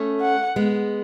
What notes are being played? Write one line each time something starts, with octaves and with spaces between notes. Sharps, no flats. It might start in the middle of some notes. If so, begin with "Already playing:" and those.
Already playing: A3 C#4
F#5
G#3 B3